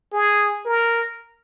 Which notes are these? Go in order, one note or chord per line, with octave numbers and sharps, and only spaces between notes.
G#4
A#4